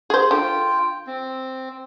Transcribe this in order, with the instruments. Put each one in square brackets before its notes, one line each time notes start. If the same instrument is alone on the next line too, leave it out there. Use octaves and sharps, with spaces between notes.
[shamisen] G#4 C5
[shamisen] D3 [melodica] F4 G5
[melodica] C4